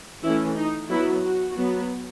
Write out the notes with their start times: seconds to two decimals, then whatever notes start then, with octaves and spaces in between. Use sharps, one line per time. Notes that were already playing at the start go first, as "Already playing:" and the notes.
0.23 E3 A3 C#4 E4
0.56 D#4
0.90 F#3 B3 E4
1.24 F#4
1.57 F#3 B3